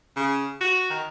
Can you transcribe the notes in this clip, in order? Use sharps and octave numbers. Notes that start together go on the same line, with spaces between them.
C#3
F#4
D#3